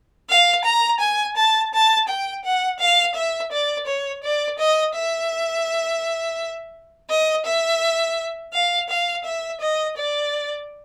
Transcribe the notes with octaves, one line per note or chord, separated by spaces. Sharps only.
F5
A#5
G#5
A5
A5
G5
F#5
F5
E5
D5
C#5
D5
D#5
E5
D#5
E5
F5
F5
E5
D#5
D5